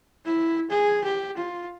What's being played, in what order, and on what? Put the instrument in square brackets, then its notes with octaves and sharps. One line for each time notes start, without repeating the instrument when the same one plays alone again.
[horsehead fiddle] E4
G#4
G4
F4